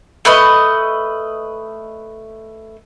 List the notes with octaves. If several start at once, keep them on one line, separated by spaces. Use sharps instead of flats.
A3 B4 D#5